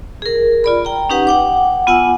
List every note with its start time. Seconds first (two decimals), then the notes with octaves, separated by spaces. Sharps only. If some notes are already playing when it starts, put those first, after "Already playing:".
0.22 G#4 A#4
0.64 F4 D5 B5
0.85 G5 A#5
1.10 C#4 D#4 G4 B4 F#5
1.27 F#5 G5 D6
1.87 B3 F4 F#5 G#5 E6